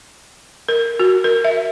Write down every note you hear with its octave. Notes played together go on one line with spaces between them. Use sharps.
A#4
F#4
A#4
E5